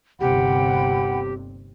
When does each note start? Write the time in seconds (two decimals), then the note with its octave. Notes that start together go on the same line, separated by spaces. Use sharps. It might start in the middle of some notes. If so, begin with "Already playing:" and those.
0.21 G1 D#2 C3 G4 F#5 G5 B5